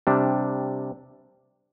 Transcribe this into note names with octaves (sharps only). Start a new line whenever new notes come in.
C3 G3 D4